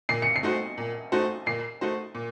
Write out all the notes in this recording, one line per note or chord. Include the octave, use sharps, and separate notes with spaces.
A#2 C7
C#7
C7
A3 D#4 F#4 C5
A#2
A3 D#4 F#4 C5
A#2 C7
A3 D#4 F#4 C5
A#2